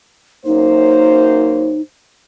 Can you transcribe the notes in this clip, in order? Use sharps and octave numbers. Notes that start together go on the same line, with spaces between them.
F#2 A#3 D#4 C5